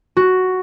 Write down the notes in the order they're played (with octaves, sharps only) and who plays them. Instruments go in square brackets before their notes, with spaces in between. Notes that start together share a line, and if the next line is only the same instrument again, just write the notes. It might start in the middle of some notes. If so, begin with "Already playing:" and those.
[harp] F#4